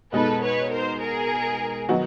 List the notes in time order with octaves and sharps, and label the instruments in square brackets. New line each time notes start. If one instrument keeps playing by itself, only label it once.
[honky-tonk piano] B2 G#3 B3 D#4 [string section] A4 B4
[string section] B4 C#5
A#4 C5
G#4 A#4
[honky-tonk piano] D#3 F#3 B3 D#4 F#4